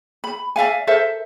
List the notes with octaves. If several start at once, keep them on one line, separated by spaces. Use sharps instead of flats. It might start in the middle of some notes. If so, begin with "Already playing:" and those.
B5
D5 E5 F5 G#5
A4 A#4 C5 E5